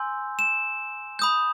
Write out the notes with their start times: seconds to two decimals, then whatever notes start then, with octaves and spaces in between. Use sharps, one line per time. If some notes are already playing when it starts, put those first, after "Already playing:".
Already playing: G#5 C6 E6 G6
0.39 E7
1.19 B5 D#6 G6